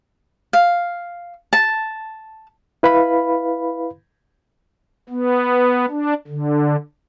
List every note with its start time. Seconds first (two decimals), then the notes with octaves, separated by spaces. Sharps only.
0.53 F5
1.53 A5
2.83 E4 B4 F5 B5
5.10 B3
5.90 D4
6.27 D3